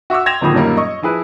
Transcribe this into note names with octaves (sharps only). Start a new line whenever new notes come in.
F#4 E5 C#6 D6 E6
G5 C6 G#6 A#6 E7 F7
D1 A#2 D#3 F3 B5 D#6
F#2 A#2 G3 A#3 D#4
D#5 C#6
F3 E4 G#4 B4